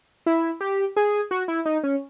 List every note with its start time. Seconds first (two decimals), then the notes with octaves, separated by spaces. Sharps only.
0.26 E4
0.61 G4
0.96 G#4
1.31 F#4
1.48 E4
1.66 D#4
1.84 C#4